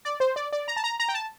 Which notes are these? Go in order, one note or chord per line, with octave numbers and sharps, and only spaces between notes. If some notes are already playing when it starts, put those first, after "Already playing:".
D5
C5
D5
D5
A#5
A5
A#5
A#5
G5
A5